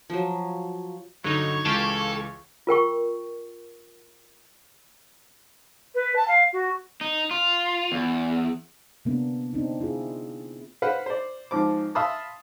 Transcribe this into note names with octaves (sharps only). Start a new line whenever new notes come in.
F3 F#3
G2 D3 F#3 D#4 C#5
C#2 E3 F4 G4 A4
F4 A#4 G5 C#6
B4
A5
F5
F#4
D#4
F4
E2
C3 A#3 B3 D4
C4 D4 D#4
C4 E4 F4 G#4
B4 C5 F5 F#5
C5 D5
G#2 F3 C4 D6
E5 F5 A5 B5 C6 D#6